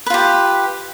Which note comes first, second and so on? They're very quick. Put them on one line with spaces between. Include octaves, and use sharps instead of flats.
B4 F4 G4